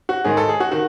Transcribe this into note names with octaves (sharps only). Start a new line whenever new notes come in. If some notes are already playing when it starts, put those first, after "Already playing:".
F#4
G#2 D#3 G#4
A4
G#4
F#4
D#3 F#4